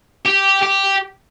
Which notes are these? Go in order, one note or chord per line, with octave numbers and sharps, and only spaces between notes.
G4
G4